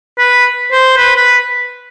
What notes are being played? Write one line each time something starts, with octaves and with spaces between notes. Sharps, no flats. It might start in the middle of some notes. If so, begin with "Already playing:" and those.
B4
C5
B4
B4